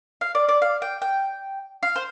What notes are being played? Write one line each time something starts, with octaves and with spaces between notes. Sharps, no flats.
F5
D5
D5
F5
G5
G5
F5
C5